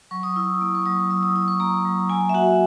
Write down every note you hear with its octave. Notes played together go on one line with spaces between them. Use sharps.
F#3 C#6
D#6
E4 E6
A#3 E6
C#6
F#3 D#6
F#3 E6
D#6
E4 D#6
C#6
A#3 A#5
F#3
A#3 G#5
E5
F#4 F#5